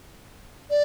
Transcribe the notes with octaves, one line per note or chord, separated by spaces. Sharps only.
D5